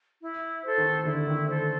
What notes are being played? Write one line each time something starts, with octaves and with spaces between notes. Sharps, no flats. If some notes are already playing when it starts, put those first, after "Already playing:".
E4
A4 C5
D#3
D3 E4
D#3
A4 C5